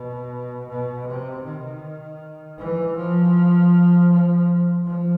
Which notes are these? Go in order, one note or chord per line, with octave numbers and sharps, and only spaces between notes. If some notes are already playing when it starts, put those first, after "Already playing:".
Already playing: B2
B2
C3
D#3
E3
F3
F3
F3